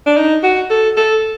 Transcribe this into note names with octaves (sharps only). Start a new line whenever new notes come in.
D4
D#4
F#4
A4
A4